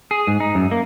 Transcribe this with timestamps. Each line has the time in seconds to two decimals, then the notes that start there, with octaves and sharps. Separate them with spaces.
0.11 G#4
0.27 G#2
0.40 D#4
0.55 F#2
0.71 A#3